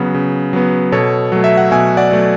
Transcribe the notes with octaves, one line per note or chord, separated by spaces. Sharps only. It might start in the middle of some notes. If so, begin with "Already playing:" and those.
Already playing: C#3 F#3 B3
C#3
F#3 B3
B2 A4 C#5
F#3 A3
E5
F#5
B2 E5 G#5
D5 F#5
F#3 A3